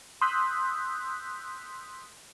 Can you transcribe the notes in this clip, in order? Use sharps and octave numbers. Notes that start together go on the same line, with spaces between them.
C6 D#6 E6 F#6 G6 B6